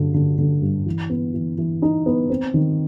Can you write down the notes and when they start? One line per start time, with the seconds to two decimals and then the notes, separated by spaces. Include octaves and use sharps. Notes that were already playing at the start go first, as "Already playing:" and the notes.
Already playing: G2 D3 F#3
0.14 D3
0.38 D3
0.62 G2
0.86 E3
1.10 B3
1.34 E3
1.58 E3
1.82 D#4
2.06 B3
2.29 C4
2.54 D#3